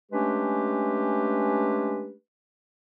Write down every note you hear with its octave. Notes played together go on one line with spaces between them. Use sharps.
G#3 A3 C#4 D4 G4 B4